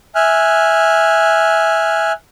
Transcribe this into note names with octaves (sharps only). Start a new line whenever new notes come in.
E5 G#5 F6 F#6